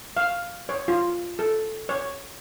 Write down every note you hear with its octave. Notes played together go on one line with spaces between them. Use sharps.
F5
C#5
F4
A4
C#5